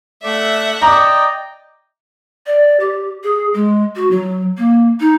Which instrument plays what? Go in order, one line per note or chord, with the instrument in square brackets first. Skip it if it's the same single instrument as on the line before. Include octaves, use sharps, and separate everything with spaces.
[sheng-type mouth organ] A3 D5 [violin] E5 F#5
[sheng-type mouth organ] D5 D#5 G5 [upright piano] A#5 D6
[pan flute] D5
G4
G#4
G#3
F#4
F#3
A#3
D#4